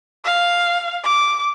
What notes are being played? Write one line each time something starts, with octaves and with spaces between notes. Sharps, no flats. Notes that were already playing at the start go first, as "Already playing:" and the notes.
F5
D6